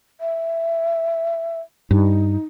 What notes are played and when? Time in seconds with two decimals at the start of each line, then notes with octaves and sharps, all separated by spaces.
0.21 E5
1.91 G2 D#4